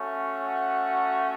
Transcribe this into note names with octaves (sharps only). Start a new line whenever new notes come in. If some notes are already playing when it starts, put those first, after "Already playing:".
Already playing: A3 C#4 F#4
F#5